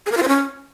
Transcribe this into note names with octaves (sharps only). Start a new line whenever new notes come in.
G#4
A#4
F4
C5
C#4